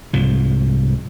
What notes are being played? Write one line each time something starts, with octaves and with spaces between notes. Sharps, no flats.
C2 G#2 F3